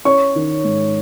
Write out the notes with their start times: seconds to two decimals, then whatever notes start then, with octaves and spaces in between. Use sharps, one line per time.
0.05 C#4 C#5 C#6
0.35 D#3
0.65 G#2